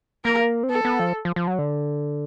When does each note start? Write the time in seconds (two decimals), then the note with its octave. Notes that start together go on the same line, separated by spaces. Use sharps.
0.25 A#3 A#4
0.63 C4
0.69 B3 A4
0.85 B3
1.00 F3
1.25 F3
1.36 F3
1.47 F#3
1.59 D3